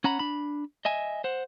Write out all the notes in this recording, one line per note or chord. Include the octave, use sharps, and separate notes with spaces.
C#4 F#5 A#5 B5
D4 B5
D#5 E5 G#5
C5 F#5